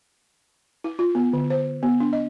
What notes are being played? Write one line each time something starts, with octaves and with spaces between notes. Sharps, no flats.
E4
F4
B3
D3
C5
B3
D4
D#5